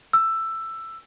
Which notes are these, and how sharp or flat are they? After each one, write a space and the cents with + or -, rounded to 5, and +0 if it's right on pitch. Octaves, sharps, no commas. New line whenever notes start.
E6 +10